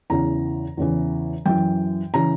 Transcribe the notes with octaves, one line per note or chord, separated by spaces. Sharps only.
E2 C#3 E3 A#5
E2 C#3 E3
F#2 E3 G5
C#3 E3 A#5